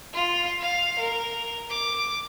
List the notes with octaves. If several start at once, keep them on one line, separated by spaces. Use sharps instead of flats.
F4
F5
A#4
D6